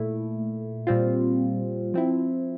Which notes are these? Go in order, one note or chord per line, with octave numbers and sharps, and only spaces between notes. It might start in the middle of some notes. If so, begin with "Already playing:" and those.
Already playing: A#2 A3 E4
A#2 G3 C4 F4
F3 C4 E4